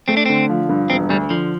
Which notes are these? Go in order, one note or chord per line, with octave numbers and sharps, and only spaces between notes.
A3 C4
D4
D3 C4
F3
G2
E1 C4
D2 G3
D3 F3